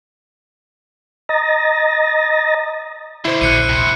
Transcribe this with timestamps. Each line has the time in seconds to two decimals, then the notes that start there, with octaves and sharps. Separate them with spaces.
1.29 D#5 A#5 D#6 A6 A#6
3.25 B2 D3 E4 C5
3.41 A#1 D#2 F#6 C#7 D#7
3.69 A2 C3